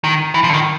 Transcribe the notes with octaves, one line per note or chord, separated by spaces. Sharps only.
D#3
E3
F3
D3
D#3